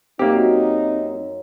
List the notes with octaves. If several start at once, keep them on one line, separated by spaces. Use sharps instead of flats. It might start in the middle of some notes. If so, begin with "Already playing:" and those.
F#2 A#3 C4 D#4 G4 E5